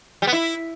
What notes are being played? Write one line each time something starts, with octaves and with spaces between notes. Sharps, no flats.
G3
B3
E4